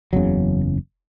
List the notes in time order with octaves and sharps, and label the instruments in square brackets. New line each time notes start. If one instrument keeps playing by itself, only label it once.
[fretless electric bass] F#1 E2 C#3 F#3